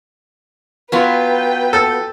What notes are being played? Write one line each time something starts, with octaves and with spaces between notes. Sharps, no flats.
F#3 B3 F4 B4 G5
A4